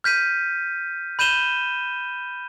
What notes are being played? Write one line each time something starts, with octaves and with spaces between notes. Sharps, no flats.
F6 G6 B6 D#7
B5 G6 D#7 E7 G7